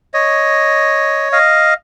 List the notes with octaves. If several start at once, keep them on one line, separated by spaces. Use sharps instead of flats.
C#5 D#5
D#5 F5